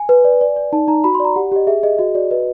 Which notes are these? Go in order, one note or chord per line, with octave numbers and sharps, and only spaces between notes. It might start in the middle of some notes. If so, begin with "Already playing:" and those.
Already playing: G#5
B4
D5
D5
D5
D#4 A5
D#4 A#5
F#4 B5
C6
D5
A#5
G4 F#5
G4 D#5
G#4 E5
G#4 D#5
F#4 D#5
F#4 D5
B4 D#5